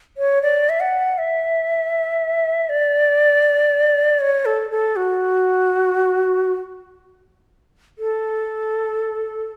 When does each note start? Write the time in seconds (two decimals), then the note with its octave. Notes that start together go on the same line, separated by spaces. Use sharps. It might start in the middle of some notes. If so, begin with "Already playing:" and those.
0.17 C#5
0.42 D5
0.69 E5
0.80 F#5
1.18 E5
2.69 D5
4.20 C#5
4.45 A4
4.71 A4
4.96 F#4
7.99 A4